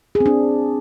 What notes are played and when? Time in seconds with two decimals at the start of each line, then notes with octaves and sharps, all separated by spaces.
0.15 G#4
0.20 C4
0.26 D4